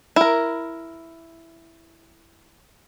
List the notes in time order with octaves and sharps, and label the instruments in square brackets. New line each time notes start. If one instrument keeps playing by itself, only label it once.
[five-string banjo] E4 A#4